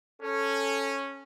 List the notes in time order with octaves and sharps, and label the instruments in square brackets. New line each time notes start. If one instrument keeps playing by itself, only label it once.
[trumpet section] C#4 [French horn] A4